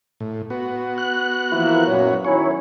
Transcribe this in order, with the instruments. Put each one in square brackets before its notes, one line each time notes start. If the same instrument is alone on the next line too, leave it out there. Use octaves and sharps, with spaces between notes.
[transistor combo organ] A2
B3 F#4
[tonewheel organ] F#6
[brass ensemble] E3 F3 A#3 [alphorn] E4
[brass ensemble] F#2 A#2 [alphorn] C#5
[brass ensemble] D#3 C#4 E4 [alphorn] F#3 [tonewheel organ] C#5